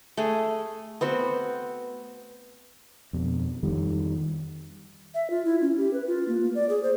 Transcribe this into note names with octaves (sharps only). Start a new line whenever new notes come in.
A3 G#4
B3 C4 F#4
F2 B2
F2 D#3 G3
E5
F4
E4
C#4
G4
B4
F4
A#3
A#3
D5
G#4
C5